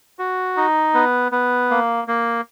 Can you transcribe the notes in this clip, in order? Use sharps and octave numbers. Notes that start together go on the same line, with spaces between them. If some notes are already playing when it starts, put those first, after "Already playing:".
F#4
D#4
B3
B3
A#3
A#3